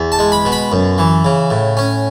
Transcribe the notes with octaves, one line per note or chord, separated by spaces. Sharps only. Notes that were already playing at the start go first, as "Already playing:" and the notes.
Already playing: E2
A5
G#3
B5
B2
B5
F#2
E3
C#3
A2
C#4